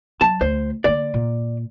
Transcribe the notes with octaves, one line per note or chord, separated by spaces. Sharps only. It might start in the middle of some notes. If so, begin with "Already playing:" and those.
F#3 A5
D2 C5
D3 A#3 D5
A#2